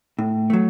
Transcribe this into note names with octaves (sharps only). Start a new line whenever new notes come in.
A2
F#3 A3